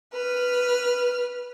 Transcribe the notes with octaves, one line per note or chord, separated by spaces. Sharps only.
B4 F6